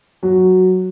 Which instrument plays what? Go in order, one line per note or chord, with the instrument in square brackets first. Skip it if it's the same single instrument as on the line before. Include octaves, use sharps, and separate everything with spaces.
[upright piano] F#3